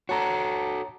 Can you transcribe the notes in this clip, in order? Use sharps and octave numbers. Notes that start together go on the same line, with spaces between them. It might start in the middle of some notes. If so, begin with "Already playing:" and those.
F#4 A4 C#5 A5 A#5